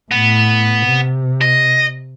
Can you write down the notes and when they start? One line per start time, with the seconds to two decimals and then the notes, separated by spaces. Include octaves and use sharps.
0.11 A2 B3
0.86 C3
1.41 D#5